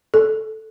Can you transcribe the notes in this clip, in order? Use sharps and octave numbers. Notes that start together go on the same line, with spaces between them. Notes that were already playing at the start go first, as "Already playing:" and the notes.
A4